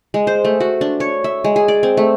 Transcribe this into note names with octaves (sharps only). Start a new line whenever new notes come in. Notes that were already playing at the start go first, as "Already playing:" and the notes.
G#3
C5
A3
F#4
D4
C#5
E5
G#3
G#4
D5
C4
A3